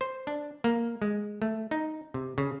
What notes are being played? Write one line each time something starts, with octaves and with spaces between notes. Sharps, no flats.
C5
D4
A#3
G#3
A3
D#4
C3
C#3